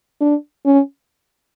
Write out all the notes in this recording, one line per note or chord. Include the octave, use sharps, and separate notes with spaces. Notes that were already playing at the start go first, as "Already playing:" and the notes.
D4
C#4